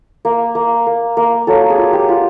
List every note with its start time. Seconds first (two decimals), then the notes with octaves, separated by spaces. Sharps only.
0.25 A#3
0.55 A#3
0.87 A#3
1.17 A#3
1.47 F#3 A4
1.70 G#4
1.78 F4
1.93 G4
2.09 F4